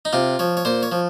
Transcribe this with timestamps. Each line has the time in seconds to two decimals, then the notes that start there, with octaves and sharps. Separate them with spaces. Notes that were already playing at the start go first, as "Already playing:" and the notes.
0.05 D#4
0.13 C3 F4
0.39 F3 C#5
0.57 C#5
0.65 A#2 C5
0.83 C#5
0.92 F3